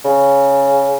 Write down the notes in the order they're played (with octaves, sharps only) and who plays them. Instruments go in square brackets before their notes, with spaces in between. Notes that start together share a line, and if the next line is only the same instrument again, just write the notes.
[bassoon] C#3